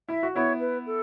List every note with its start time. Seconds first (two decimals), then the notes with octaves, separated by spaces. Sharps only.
0.09 E4 E5
0.23 F#4
0.34 B3 E4 C#5
0.59 B4
0.86 A4